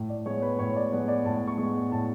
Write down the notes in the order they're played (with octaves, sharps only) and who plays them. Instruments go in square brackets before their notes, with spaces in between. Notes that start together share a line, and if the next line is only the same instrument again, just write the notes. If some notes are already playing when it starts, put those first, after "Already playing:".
Already playing: [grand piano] A2
D5
G#3 B3 C#5
B4
A2 C#5
D5
G#3 B3 D5
D5
A2 A5
C#6
G#3 B3
A2 A5